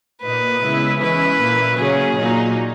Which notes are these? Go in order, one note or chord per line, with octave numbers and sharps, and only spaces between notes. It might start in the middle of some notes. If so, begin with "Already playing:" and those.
A#2 A#3 D#4 B4
C#3 G#3 B3 E4
E3 G#3 C#4 E4 B4
A#2 A#3 E4
C#3 F#3 A#3 C#4 G#4
A#2 F#3 A#3 D#4